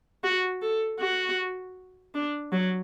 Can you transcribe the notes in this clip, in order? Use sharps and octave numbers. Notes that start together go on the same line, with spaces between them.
F#4
A4
F#4
D4
F#3